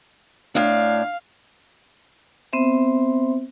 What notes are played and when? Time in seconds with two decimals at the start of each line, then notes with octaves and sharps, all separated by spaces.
0.55 A2 D4 F5
2.53 B3 C4 C5 E5